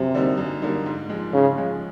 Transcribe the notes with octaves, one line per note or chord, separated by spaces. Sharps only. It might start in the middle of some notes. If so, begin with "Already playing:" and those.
Already playing: F#2 C3
D3 G3 A#3 D#4
F#2
D3 G3 A#3 D#4
G#2
F3 G#3
G#2 C#3
F3 G#3